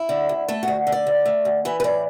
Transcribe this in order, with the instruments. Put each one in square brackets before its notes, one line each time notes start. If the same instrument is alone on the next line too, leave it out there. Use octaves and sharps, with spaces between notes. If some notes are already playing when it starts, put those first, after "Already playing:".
Already playing: [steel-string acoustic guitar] E4
D3
D2
A3 A4
D2 F#4
D3
D5
D2
A3
D2
E3 B4
B4
A2 D5